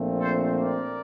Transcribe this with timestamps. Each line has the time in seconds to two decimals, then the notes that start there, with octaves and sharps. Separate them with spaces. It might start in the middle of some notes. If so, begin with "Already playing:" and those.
Already playing: A#1 A#2 A3 C4
0.21 A4 C5
0.59 A#4 D5